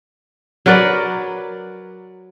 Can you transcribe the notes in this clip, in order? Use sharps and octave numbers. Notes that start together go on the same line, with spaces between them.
F#3 A#4 B4 D5